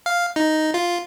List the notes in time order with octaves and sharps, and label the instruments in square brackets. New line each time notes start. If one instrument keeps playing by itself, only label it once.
[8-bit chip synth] F5
D#4
F4